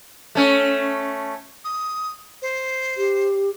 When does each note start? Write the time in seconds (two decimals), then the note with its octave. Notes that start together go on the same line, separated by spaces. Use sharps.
0.35 A3 C#4
1.65 D#6
2.42 C5
2.97 G4